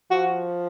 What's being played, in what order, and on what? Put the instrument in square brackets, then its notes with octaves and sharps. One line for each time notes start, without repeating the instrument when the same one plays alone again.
[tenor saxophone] F3 [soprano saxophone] F#4